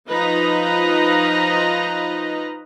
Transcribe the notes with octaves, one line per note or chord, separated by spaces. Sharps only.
F3 D#4 F4 B4 D#5 A#5